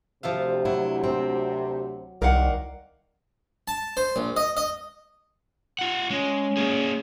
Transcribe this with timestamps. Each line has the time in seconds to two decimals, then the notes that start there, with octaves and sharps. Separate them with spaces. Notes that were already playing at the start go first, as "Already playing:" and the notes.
0.23 D2 C3 F3 E5 F5
0.65 F#3 E4
1.04 C4
2.22 C2 D#3 A#4 D5 F5 F#5
3.68 A5
3.97 C5
4.16 A#1
4.37 D#5
4.57 D#5
5.79 F4 F#5
6.11 G#3 C#4
6.57 A#3 G#4